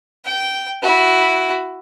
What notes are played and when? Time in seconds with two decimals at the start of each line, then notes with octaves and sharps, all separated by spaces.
0.25 G5
0.82 E4 F#4